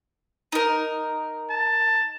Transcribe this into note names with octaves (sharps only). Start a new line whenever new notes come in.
D#4 A#4
A5